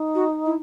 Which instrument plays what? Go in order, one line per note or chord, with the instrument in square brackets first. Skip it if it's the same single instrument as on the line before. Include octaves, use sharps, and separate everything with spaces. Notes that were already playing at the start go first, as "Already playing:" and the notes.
Already playing: [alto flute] D#4
[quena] F#4
E4